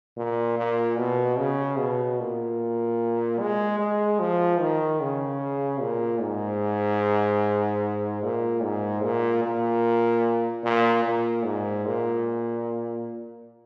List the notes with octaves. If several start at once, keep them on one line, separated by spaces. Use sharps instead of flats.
A#2
A#2
B2
C#3
B2
A#2
G#3
G#3
F3
D#3
C#3
A#2
G#2
A#2
G#2
A#2
A#2
A#2
A#2
G#2
A#2